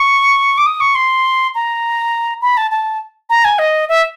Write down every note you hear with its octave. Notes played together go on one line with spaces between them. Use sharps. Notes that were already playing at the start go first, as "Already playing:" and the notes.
Already playing: C#6
D6
D#6
C#6
C6
A#5
B5
A5
A5
A#5
G#5
D#5
E5